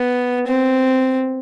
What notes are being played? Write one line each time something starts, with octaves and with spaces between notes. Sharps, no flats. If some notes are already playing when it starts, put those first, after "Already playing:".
Already playing: B3
C4